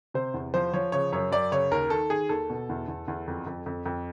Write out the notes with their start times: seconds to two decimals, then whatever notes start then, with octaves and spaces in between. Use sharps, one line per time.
0.14 C3 C5
0.34 E2
0.54 F3 C5
0.73 F3 C#5
0.92 C#3 C#5
1.12 F#2 C#5
1.31 F#2 D5
1.52 C#3 C#5
1.71 D#2 A#4
1.90 D#3 A4
2.10 D#3 G#4
2.29 D#2 A4
2.50 B2
2.69 E2
2.88 E2
3.08 E2
3.27 F2
3.46 F2
3.66 F2
3.86 F2